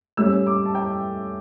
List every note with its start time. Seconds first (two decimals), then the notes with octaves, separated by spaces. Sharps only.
0.17 A2 G3 C#4 E6
0.47 D6
0.66 A5
0.75 G5